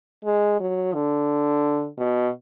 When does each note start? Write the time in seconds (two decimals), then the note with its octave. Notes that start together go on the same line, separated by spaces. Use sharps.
0.25 G#3
0.60 F#3
0.94 D3
1.97 B2